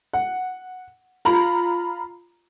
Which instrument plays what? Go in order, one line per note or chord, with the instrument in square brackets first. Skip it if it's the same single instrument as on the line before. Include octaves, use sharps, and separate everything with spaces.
[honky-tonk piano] F#5
F4 A#5 B5